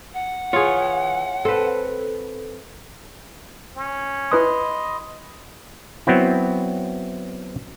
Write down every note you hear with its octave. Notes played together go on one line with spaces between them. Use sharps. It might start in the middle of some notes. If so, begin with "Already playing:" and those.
F#5
E3 F4 G#4 C#5
C4 A4 B4
C#4
E4 B4 D#5 B5 C6 D#6
F#3 B3 C4 E4